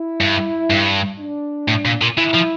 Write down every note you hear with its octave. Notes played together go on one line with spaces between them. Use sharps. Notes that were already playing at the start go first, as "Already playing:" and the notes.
Already playing: E4
G2
G2
D4
A2
A#2
A#2
E3 E4
F3